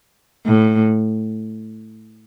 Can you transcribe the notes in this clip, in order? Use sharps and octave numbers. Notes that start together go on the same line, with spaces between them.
A2